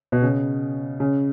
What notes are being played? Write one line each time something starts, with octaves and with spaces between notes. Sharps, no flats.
B2
C#3
C#3